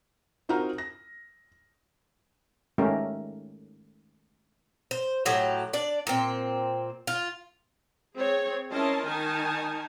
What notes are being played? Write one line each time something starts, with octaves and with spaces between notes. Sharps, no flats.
C4 D#4 F4 F#4 A#4
A#6
D#3 G#3 A3 C#4 G4 A#4
C5
A2 F#3 G4
D4 D5
A#2 C4
F4
C4 G#4 C#5
C#4 E4 A#4 D#5 A5 C6
D#3 D#4 G#5 A5